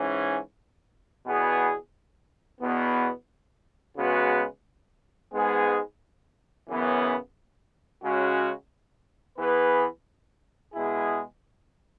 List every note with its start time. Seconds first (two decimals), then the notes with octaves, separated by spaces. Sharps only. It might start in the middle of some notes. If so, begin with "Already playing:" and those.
Already playing: G#2 E3 C#4
1.26 E2 B2 B3 G#4
2.61 E2 B2 B3
3.97 C#3 G#3 B3 F#4 B4
5.32 G#2 G#3 B3 G#4 B4
6.68 F#2 C#3 E3 B3
8.03 C#3 G#3 C#4 F#4
9.38 E3 B3 G#4 B4
10.73 B2 G#3 E4 G#4